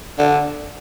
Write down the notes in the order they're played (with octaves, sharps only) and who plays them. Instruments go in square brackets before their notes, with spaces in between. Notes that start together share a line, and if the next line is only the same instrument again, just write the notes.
[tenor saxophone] D3